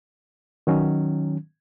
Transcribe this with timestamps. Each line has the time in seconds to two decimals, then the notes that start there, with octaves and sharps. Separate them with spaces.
0.67 D#3 F#3 C#4